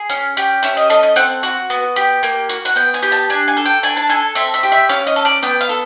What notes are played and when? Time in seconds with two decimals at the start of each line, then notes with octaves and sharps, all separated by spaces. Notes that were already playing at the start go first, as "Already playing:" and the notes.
Already playing: G#4
0.10 C#4
0.37 G4
0.63 C#4 E5
0.77 D#5
0.90 A4 D#5
1.03 D#5
1.16 C4 F#5
1.43 F#4
1.70 B3
1.96 G4
2.23 A#3
2.49 F#4
2.65 F#5
2.76 B3 G5
2.94 G#5
3.02 G4
3.12 A5
3.30 D4 G#5
3.48 G#5
3.57 A4
3.65 G5
3.83 D4 G#5
3.97 A5
4.09 A4 G#5
4.35 C4 E5
4.54 E5
4.63 G4
4.72 E5
4.89 C#4 F5
5.07 D#5
5.16 A4
5.25 D5
5.43 B3 G5
5.61 F5
5.69 A4